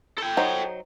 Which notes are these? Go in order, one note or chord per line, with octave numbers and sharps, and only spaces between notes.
A4 G5
F#3 D#4 C5